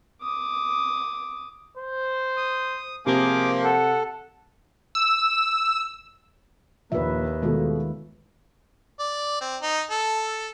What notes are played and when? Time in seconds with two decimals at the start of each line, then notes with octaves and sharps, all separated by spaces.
0.23 D6 D#6
1.77 C5
2.37 D#6
3.06 C3 F3 A#3 G#4 D6
3.64 A4 F#5
4.95 E6
6.92 A#1 D#2 B4 E5
7.42 B2 D#3 G#3 A3 F4
8.99 D5
9.41 C4
9.62 D#4
9.91 A4